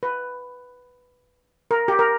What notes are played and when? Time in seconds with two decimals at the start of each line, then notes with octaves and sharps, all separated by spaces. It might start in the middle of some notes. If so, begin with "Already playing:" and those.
0.03 B4
1.71 A#4
1.88 G4
1.99 A#4